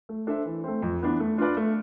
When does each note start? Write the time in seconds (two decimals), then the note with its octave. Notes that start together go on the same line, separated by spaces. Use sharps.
0.09 A3
0.27 D4 A4 C5 E5
0.45 E3
0.64 A3 C4
0.82 F2
1.02 E3 B3 D4
1.20 A3
1.38 D4 F4 B4 D5
1.57 A3